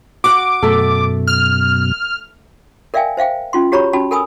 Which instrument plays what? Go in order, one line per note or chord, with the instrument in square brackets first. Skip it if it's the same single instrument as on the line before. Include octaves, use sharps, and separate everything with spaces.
[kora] F#4 F#5 [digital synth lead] D6
[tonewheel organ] F#2 B2 [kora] A3 A4
[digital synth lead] F6
[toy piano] A#4 D5 E5 F5 G5 G#5
C5 E5 F5 G5
C#4 F4 C6
F#4 G4 C#5 A#5 B5 C#6
C#4 F#4 A5 B5
A4 A#4 G#5 B5 D#6 E6